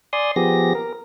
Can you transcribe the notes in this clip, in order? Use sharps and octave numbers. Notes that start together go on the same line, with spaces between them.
D5 G#5 C6 D#6
F3 B3 G4 G#4 A#6
A#4